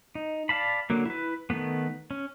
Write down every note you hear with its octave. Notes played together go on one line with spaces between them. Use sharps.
D#4
D5 F5 A5 B5
D3 F#3 A#3
E4 B4
D#3 F#3 A3 B3
C#4